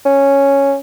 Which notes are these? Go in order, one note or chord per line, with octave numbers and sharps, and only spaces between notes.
C#4